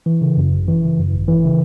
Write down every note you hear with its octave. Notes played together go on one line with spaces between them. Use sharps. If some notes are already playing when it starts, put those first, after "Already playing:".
E3
C#3
F#2
G#1
E3
C#3
F#2
G#1
E3
C#3